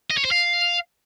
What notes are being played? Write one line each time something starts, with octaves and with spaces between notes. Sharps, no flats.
D#5
C#5
C5
F5